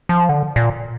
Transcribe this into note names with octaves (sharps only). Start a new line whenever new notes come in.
F3
D3
A#2